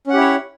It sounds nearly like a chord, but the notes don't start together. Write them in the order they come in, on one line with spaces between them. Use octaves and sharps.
C#4 F#5 G4 E4 C#5